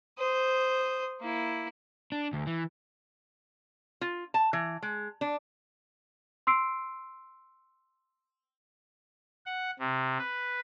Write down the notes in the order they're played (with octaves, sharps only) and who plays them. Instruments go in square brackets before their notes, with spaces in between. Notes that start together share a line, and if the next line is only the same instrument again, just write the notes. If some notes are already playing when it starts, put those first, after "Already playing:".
[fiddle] C5 D#6
A#3 E4
[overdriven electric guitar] D4
D2
E3
[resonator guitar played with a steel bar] F4
A5
E3
G#3
D4
[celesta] C6 E6 C7 D7
[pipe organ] F#5
C3
B4